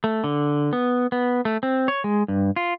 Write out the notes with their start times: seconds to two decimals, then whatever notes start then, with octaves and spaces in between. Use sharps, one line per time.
0.04 A3
0.24 D3
0.73 B3
1.12 B3
1.45 A3
1.63 C4
1.88 C#5
2.04 G#3
2.28 G2
2.56 F4